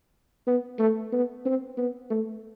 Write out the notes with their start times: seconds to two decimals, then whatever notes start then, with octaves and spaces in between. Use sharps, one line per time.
0.47 B3
0.79 A3
1.12 B3
1.45 C4
1.77 B3
2.11 A3